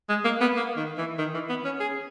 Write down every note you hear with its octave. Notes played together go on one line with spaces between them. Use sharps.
G#3
A#3
B3
A#3
D#3
E3
D#3
E3
B3
C#4
G#4